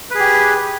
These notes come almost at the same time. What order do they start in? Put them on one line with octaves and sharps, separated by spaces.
B4 G#4 G4